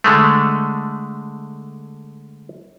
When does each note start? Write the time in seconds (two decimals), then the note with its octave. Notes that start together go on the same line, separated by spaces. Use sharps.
0.04 D3 G#3 A3